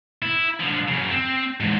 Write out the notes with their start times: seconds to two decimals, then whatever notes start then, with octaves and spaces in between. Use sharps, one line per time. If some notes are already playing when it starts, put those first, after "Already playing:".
0.22 E4
0.60 D3 F3
0.88 F#2 C#3
1.11 C4
1.60 E2 G#2